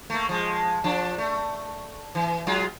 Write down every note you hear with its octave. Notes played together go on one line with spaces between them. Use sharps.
A3 A#3
F3 G#3
F3 D4
A3
E3
F#3 G#3 F4